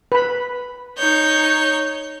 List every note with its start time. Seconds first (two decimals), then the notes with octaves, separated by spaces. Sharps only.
0.12 B4 B5
0.98 D#4 C#5 G6